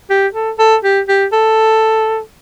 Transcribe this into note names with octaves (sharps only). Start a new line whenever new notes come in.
G4
A4
A4
G4
G4
A4